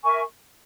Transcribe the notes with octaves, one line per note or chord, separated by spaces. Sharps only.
A#4 E5 G#5 C#6